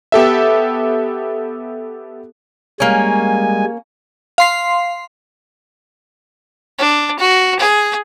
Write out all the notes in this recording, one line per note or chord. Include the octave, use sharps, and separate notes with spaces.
B3 G4 A4 E5
G3 G#3 A#3 C#4 G#5
F5 C6 C7
D4
F#4
G#4